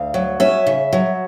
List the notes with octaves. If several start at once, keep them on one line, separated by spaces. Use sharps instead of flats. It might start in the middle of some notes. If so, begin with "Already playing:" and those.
Already playing: D2 F5
F#3
C#4 E5
C#3
F#3